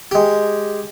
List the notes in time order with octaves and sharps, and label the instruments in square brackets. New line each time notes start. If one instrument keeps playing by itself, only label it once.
[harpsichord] G#3 G4